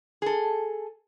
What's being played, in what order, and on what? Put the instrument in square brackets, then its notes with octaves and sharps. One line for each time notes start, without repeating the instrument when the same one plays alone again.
[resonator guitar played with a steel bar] G#4 A4